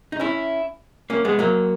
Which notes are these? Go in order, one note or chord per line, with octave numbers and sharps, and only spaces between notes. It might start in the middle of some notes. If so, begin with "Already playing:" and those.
D#4
C#4 E4
A#3 C#4
G#3 B3
F#3 A#3